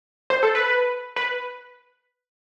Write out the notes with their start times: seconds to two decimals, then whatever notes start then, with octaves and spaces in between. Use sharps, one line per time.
0.30 C5
0.43 A4
0.55 B4
1.16 B4